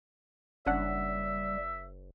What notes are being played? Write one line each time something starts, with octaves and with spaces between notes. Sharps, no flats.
F#1 G3 C#4 D4 E5 F#5